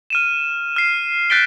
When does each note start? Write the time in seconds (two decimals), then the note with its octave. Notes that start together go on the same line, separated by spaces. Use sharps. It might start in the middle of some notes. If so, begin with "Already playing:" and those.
0.10 F6 D#7 E7
0.76 F6 C7
1.30 F#6 G6 A6 B6 D7 G7